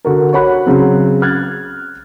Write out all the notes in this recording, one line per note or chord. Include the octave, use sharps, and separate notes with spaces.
D3 F#4 A#4
F#4 C#5 F#5 B5 F#6
C#3 F#3 C4
F6 F#6 G#6 A6